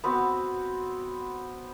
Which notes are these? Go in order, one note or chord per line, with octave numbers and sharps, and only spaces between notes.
B3 C4 F#4